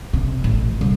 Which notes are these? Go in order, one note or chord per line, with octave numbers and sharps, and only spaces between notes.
C3
A1
C2